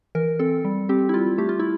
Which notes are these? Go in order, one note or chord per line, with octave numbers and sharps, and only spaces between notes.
E3 A#4
C4 A4
G3
C4 G4
E4
G3 F4
A3 G4
F4
E4